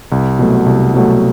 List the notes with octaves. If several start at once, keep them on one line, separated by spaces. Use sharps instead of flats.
C2
B2 F#3 A3
C2
B2 F#3 A3